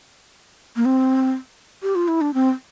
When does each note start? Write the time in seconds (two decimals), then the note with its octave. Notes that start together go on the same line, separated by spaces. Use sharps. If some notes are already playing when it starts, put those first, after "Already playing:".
0.76 A#3
0.85 C4
1.82 G4
1.95 F4
2.08 E4
2.21 D4
2.34 C4